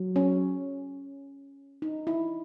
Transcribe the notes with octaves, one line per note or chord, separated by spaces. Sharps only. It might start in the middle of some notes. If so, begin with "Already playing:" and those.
Already playing: F#3
C#4
D#4
E4